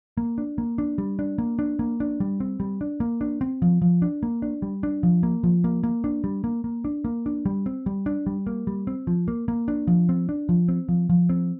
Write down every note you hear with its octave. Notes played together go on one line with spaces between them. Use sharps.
A#3
D4
A#3
D4
G3
D4
A#3
D4
A#3
D4
G3
C4
G3
D4
A#3
D4
C4
F3
F3
D4
A#3
D4
G3
D4
F3
A#3
F3
A#3
A#3
D4
G3
A#3
A#3
D4
A#3
D4
G3
C4
G3
D4
G3
A#3
G3
C4
F3
A#3
A#3
D4
F3
C4
D4
F3
C4
F3
F3
C4